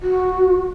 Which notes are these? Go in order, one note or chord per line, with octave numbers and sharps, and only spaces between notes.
F#4